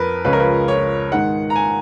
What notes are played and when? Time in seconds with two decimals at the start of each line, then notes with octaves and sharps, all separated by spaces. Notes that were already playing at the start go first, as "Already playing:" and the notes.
Already playing: F2 F3 A#4 B4
0.25 C#2 C#3 F3 G#3 C#4 B4
0.33 A#4
0.40 B4
0.68 C#5
1.12 G#2 D#3 G#3 F#5
1.50 A#5
1.56 G#5